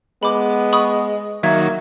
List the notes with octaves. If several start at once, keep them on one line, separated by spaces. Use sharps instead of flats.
G#3 B3 B5 D6
B5 C#6 D#6
D#3 F#3 A#3 E5 G#6